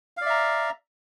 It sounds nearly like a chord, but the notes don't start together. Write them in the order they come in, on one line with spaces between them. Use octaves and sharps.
F5 D5 E5 A#5